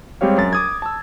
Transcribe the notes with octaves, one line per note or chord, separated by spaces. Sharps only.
G3 G#3 C4 G4 C#5 F5
F#2 A6
D6 D#6 G#6
A5 E6